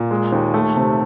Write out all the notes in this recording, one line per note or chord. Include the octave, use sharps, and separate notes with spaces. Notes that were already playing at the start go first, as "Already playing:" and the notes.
Already playing: A#2
G#3
D#2
A3
C3